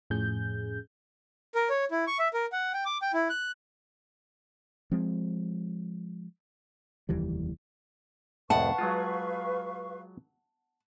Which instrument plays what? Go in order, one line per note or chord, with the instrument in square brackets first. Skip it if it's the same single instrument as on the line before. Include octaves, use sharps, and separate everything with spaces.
[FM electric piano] F2 A2 F3 C#4 G#4 G6
[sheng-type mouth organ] A#4
C#5
E4
C#6
E5
A#4
F#5
G5
D6
G5
E4
F#6
[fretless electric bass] F3 G#3 C4
F1 D#2 E3 G3
[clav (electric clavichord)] C2 F2 A2 [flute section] B4 F5 C#6 [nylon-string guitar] F#5 A5
[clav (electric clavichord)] F#3 G#3 F4